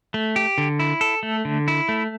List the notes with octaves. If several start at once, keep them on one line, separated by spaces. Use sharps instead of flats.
A3
G4
D3
E4
A4
A3
D3
E4
A3